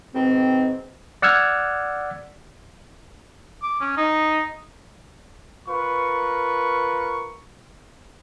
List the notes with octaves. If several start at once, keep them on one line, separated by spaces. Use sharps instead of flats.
G#2 B2 D#3 C4
D5 F#5 E6 F6 G#6
D6
C#4
D#4
F4 A#4 B4 C#6